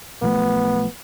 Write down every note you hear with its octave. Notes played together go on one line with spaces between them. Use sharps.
B1 F3 A3 B3